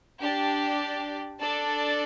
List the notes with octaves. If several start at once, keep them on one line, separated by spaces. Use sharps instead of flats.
D4 G4 D5
D4 A4 D5 A5